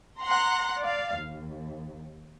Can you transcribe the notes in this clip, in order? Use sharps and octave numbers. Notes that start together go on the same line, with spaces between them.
F#5 A#5 C6
D5 F5
D#2